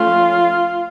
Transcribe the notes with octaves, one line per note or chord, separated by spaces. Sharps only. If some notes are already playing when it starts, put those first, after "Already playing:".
Already playing: F3 A3 C#4 F4